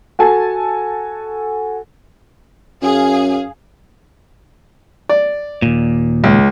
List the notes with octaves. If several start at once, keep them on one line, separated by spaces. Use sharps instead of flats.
F#4 A4 G#5 A5
F#2 G#4 F5
D5
D#2 A#2
C#2